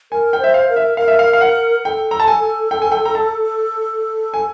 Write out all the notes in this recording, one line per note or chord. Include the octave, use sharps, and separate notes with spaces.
A#4 G#5
G5
C5 E5
F5
A#4
E5
A#4 F5
E5
F5
F5
F#5
A4 G5
A#5
A5
G#5
G5
G#5
G5
A#5
A5
G#5